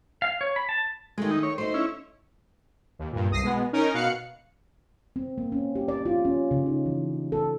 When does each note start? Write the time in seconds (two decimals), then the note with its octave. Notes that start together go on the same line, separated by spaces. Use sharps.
0.22 F5
0.41 C#5
0.56 B5
0.69 A5
1.18 D#3 G#3 A3
1.31 D#4
1.43 C#5
1.58 A3 D#4 C5
1.74 C#4 E4
2.99 D#2
3.12 G2 A#2
3.30 C2 D#6 A#6 C7
3.42 B2 G#3 B3
3.73 C#4 D#4 A#4
3.94 B2 F5 F#6 C#7
5.16 C4
5.38 A#3
5.52 C#4
5.75 G4
5.88 D5
6.05 F4
6.25 C#4
6.51 C#3
6.66 D#4
6.86 E3
7.32 A4